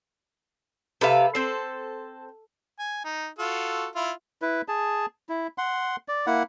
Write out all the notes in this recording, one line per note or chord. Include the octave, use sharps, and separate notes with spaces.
C3 A4 B4 E5 F5
C4 A4 C5
G#5
D#4
F4 F#4 A4
E4 F4
E4 B4
G#4 A5
E4
F#5 C6
D5
A#3 E4 F#5